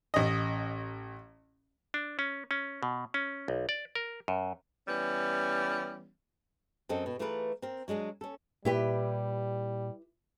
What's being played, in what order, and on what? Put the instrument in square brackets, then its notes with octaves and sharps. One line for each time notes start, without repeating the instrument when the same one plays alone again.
[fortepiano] A1 D#5
[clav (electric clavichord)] D4
C#4
C#4
B2
C#4
B1
D5
A#4
F#2
[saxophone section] E3 G3 B3 C#4
[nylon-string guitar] F#2 C4 A4 D#5
B2
E3 A3 F4 G#4 A#4 B4
C4 A#4
F#3 G#3 D4 G#4
C#4 A4
[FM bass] A#2 [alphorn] G3 [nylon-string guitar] E4 G4 B4